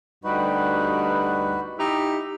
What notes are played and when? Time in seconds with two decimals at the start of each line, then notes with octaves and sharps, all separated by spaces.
0.24 D2 G2 G3 D#4 F#4 B4
1.79 D#4 E4 G4